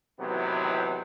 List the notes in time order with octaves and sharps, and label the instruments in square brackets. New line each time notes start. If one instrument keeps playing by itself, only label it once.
[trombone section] A2 C3 D#3 E3 F#3 B3